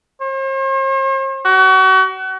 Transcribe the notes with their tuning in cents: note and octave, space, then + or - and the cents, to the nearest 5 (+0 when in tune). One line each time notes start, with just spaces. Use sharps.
C5 +45
F#4 +35